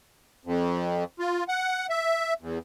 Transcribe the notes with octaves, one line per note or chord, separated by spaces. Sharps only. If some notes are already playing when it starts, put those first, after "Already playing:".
F2
F4
F#5
E5
E2